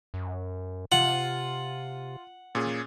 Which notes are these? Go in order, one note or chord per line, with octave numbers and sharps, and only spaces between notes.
F#2
C3 F4 F#5
A#2 C#4 G#4